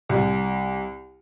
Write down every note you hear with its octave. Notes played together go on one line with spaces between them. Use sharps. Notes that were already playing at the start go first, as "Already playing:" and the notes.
C2